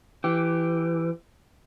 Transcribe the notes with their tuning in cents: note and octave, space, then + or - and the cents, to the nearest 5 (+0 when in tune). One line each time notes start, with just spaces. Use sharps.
E3 +15 G4 +0